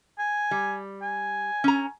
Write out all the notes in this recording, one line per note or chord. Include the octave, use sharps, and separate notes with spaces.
G#5
G3
G#5
C#4 A#5